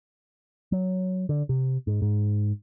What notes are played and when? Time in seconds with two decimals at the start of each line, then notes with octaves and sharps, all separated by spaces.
0.72 F#3
1.29 D3
1.49 C3
1.87 G#2
2.02 G#2